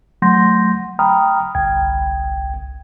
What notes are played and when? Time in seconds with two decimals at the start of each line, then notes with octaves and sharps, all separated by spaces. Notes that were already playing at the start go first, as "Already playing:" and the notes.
0.22 F#3 A3 F#5 C6 G6 A#6
0.99 G5 A#5 B5 D#6 F6
1.55 G1 C2 G5 G#6